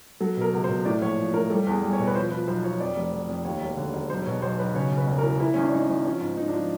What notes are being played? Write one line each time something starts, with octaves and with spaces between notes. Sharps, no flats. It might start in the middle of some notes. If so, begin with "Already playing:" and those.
F#3 A4
B2 A#4
C#2
C5
B2
A2 D5
A#1 C#5
F3
A2 A#4
G3 A4
E2
G#4
G3
C#5
B2
B4
F3 C5
F3 B4
B1 C5
F3 C#5
F2 D5
F1
F2
F2
D#2 C#5
E1
D3
E1
B1 C5
B2 C#5
B1 C5
B1 B4
C#3 C#5
C#3
B4
E1
A#4
E3
E3 E4
G#1 C#4
D4
G#1 D#4
G#1
F3 C#4
G#2
F3 D#4
D4
F3